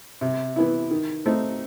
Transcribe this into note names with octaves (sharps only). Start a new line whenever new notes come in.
C3
E3 B3 E4
D#3
A3 C4 D#4